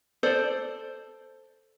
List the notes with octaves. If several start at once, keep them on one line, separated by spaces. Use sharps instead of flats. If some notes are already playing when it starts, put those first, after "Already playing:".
A4 C5 D5